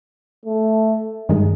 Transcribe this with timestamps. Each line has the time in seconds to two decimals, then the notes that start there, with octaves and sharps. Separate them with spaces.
0.45 A3
1.29 G2 D#3 G#3